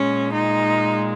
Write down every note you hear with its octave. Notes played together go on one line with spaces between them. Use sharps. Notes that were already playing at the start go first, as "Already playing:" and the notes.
Already playing: A#2 G#3 C#4
D#4